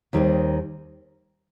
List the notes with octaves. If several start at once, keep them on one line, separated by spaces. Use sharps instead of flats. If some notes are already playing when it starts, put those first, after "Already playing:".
D#2 D#3 G3 C4